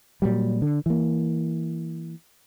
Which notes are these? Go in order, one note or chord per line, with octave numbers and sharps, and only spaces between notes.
A#2 F#3 G3
D3
E3 A#3